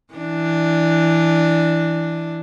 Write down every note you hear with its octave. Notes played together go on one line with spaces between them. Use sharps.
E3 D4